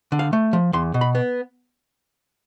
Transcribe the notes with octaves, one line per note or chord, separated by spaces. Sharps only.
D3
F5
A3
F3
E2 C6
B2
B5
B3